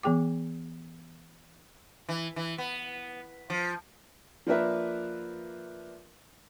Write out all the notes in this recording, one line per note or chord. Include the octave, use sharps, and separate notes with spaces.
E3 B3 G#4 G5 D6
E3
E3
B3
F3
F3 A#3 D4 A#4 B4 E5